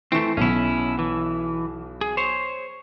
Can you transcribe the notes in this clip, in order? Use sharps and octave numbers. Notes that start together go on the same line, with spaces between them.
E3 A3 C4 C#6 E7
B1 B2 C#4 E4
E3
G#4
C5 C#5